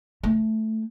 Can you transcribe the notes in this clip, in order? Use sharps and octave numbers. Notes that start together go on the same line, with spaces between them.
A3